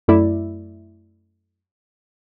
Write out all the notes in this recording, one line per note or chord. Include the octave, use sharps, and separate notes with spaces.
F#2 A3 E4 D5 E5